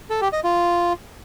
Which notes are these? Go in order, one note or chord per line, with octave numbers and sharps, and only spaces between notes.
A4
G4
D#5
F4